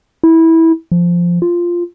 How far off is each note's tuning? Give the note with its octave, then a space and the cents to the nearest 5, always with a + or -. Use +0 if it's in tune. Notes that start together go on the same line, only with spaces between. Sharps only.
E4 -15
F3 -5
F4 -5